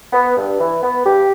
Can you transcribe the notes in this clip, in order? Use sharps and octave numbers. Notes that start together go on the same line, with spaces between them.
B3
G2
E3
B3
G2 G4